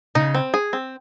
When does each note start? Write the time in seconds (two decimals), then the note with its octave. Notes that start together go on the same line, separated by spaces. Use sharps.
0.15 C#3 D#4
0.35 C4
0.54 G#4
0.73 C4